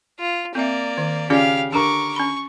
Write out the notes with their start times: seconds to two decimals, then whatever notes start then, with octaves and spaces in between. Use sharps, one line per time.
0.19 F4
0.55 A#3 C4 D5 E5
0.98 D#3
1.30 C#3 C#4 F4 G4 D5 F5
1.72 D3 G4 A#4 A5 C#6 D6
2.16 C#4 B5 C#6